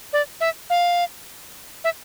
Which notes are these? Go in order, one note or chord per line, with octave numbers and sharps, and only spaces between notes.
D5
E5
F5
E5